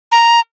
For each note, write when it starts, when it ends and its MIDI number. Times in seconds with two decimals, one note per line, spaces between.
0.12 0.40 82